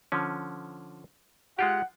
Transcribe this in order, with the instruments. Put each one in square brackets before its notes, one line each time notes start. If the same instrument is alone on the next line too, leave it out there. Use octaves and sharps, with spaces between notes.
[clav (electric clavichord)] D3 F3 C#4
[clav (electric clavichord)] G#3 F4 G4 [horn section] F#5